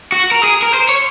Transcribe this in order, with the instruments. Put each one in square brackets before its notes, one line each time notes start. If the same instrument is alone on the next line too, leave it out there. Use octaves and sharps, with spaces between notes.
[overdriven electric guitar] F#4
A#4
G#4
A#4
C5
C#5